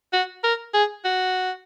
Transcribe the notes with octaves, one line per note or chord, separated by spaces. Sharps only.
F#4
A#4
G#4
F#4